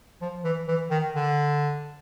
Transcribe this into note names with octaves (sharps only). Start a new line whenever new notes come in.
F3
E3
E3
D#3
D3